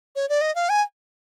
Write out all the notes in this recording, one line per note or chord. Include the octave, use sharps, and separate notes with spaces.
C#5
D5
D#5
F5
G#5